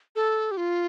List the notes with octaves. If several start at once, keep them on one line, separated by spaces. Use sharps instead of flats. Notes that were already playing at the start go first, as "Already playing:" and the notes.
A4
G4
F4